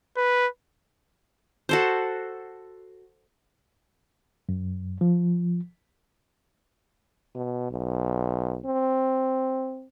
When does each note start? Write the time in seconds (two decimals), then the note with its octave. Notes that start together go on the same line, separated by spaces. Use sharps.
0.17 B4
1.69 F#4 A4 C5
4.49 F#2
5.01 F3
7.35 B2
7.71 B1
8.66 C4